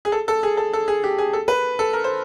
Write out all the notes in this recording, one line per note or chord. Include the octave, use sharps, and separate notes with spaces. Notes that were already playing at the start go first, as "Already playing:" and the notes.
G#4
A4
A4
G#4
A4
A4
G#4
G4
G#4
A4
B4
A4
A#4
C5